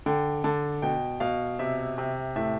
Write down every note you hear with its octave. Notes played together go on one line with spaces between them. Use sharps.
D3 G5
D3 A5
B2 G5
B2 F5
C3 E5
C3
A2 E5